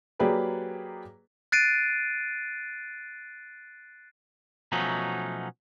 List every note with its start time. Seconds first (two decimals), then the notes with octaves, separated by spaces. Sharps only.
0.19 F#3 A#3 G4 G#4 B4 D5
1.52 F#6 A6 C7 D7 D#7
4.72 B2 F3 F#3 A3 C#4 D#4